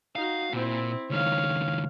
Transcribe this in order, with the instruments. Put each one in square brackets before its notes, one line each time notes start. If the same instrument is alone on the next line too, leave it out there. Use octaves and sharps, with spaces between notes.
[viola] D#4 F#4 [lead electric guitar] F5
[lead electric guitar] A#2 [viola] C4 E4
[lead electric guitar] C#2 D#3 [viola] C#5 F5